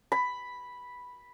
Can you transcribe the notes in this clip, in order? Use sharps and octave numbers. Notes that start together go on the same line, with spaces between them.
B5